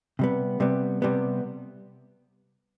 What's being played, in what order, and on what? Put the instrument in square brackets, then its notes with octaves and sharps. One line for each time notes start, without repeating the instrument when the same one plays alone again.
[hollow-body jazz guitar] C3 G3 B3
C3 G3 B3
C3 G3 B3